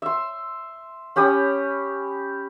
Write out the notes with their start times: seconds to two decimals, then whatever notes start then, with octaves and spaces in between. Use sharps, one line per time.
0.02 E5 C6
1.16 C#4 G4 B5 D#6